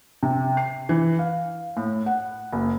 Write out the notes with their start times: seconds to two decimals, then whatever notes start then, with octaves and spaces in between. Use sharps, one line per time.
0.23 C3
0.57 C7
0.89 E3
1.19 F5
1.77 A2
2.06 F#5
2.53 F#1